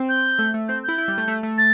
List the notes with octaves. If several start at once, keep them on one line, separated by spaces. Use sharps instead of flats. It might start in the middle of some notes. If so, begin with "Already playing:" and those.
Already playing: C4
G6
A3
A3
C4 G6
E4 G6
E4
G3
A3
A3
A3
A6